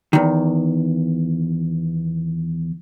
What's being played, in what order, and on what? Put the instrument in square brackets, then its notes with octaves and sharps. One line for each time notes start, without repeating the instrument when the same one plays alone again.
[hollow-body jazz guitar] E2 D#3